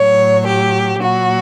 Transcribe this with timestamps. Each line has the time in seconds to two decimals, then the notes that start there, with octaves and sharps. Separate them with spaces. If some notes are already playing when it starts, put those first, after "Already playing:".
Already playing: A2 F#3 C#5
0.47 G4
1.01 A#2 F#3 F#4